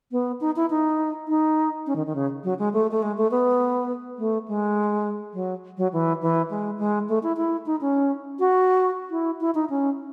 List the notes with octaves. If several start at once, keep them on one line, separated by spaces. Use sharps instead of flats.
B3
D#4
E4
D#4
D#4
C#4
D#3
D#3
C#3
F#3
G#3
A3
A3
G#3
A3
B3
A3
G#3
F#3
F#3
E3
E3
G#3
G#3
A3
E4
E4
D#4
C#4
F#4
E4
E4
D#4
C#4